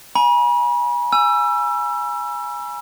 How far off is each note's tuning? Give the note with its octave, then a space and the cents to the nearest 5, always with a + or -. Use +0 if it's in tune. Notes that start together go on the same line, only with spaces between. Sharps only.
G#5 +0 B5 -40
G#5 +0 E6 +25